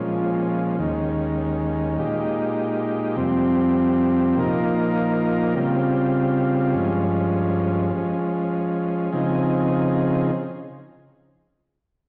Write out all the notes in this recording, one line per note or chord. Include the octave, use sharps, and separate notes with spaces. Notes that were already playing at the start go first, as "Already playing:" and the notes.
Already playing: A#2 F3 G#3 C#4
D#2 D#3 G#3 C#4
A#2 G#3 D#4 G4
F2 C3 G3 C4
A#2 F3 A#3 D#4 A#4
C#3 G3 C4 F4
G2 F3 G#3 C#4
F3 G#3 C#4
C#3 F3 C4 D#4 G#4